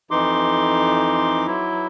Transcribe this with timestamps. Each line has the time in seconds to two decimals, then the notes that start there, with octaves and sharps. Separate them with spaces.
0.11 F2 E3 D#4 C6 D6
1.47 F#3 E4